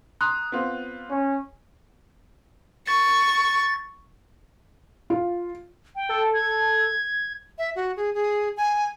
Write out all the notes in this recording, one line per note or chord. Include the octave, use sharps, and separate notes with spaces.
A#5 C6 D#6 F#6
B3 C4 F4
C#4
C#6 A6
F4
G5
A4
G#6
E5
F#4
G#4
G#4
G#5